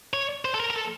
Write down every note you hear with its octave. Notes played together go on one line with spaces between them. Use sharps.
C#5
C5
A4
A#4
A#4
A4